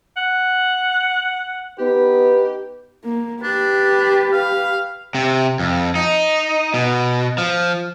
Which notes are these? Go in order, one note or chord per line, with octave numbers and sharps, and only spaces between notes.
F#5
B3 D#4 G4 B4
A#3
D4 G4 B4
F5
C3
F2
D#4
B2
F3